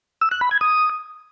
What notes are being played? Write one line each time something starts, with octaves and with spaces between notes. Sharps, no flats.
E6
F#6
B5
G#6
D#6